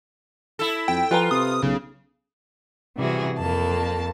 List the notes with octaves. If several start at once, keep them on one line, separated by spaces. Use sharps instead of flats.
E4 A4
F2 G5
F3 F4 B4 G#5 A#5
C3 D#6
B1 C#3
C3 E3 G3 F#4 G#4
F2 A#3 A5